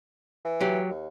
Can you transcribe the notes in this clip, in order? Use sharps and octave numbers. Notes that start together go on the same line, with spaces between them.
E3
F#3 G4
D#2